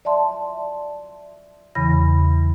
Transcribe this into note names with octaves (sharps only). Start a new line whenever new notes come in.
D5 E5 A5 C6
E2 C#3 E3 B5 A#6